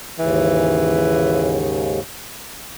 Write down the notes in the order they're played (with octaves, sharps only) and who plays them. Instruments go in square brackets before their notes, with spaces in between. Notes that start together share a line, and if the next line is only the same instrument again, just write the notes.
[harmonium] D#2 G#2 C#3 [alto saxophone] E3